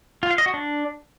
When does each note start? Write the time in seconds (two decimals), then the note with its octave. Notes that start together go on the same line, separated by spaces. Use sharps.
0.23 F4
0.31 F5
0.38 D#5
0.46 F#4
0.54 D4